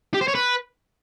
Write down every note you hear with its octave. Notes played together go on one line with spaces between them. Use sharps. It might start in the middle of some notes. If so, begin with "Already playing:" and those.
G4
C5
C#5
B4